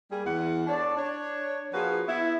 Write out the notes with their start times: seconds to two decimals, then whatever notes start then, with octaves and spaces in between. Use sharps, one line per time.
0.11 G3 A#3 G#4
0.25 E2 E3 F#5
0.67 D4 A4 C#5 D5
0.96 D4 C#5
1.73 F3 A#3 F4 F#4 G#4 B4
2.07 B3 E4